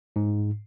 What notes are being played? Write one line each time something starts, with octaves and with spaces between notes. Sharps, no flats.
G#2